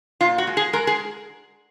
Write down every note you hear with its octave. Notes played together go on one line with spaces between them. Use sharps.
A#2 F4
F#4
G#3
G#4
G#3 A#4
G#4